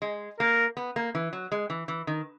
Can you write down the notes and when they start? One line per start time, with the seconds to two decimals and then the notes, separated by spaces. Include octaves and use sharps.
0.02 G#3
0.40 A#3 A#4
0.77 B3
0.96 A#3
1.15 E3
1.33 F#3
1.52 G#3
1.70 E3
1.88 E3
2.07 D#3